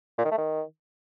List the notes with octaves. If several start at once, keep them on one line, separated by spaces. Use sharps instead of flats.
A#2
D#3
A3
D#3